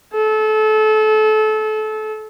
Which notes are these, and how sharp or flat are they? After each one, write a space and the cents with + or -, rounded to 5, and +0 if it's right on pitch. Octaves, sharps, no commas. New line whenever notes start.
A4 -30